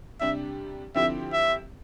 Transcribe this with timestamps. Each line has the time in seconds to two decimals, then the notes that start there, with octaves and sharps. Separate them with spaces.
0.20 C3 G3 D4 G4 E5
0.95 D3 F3 C4 E4 G4 E5
1.33 E5